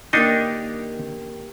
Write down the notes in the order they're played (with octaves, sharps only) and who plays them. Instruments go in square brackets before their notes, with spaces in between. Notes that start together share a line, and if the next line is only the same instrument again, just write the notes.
[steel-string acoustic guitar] D#3 A#3 G4 [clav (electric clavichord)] D4 D#4 D#5